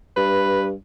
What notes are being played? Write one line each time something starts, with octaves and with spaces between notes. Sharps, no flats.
G2 B4